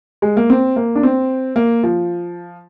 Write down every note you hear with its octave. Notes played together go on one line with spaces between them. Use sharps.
G#3
A#3
C4
A#3
D4
C4
A#3
F3